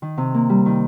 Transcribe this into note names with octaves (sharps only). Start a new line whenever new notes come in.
D#3
C3
A#3
G3
D#3